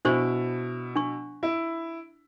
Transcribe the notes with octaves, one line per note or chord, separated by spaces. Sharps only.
B2 D4 E4 C5 C#6
D4 C#6
E4